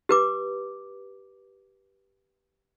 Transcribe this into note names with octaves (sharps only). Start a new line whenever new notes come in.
G4 B4 D6